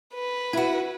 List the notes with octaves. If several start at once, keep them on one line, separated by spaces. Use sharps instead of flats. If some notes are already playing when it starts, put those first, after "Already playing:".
B4
E4 F#4